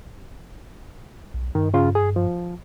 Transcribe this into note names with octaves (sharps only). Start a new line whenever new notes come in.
B1
G2 D#3
C#3 C#4 F4
G#4
F3